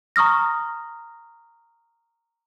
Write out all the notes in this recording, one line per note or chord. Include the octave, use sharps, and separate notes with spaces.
A#5 C#6 D#6 F6 A#6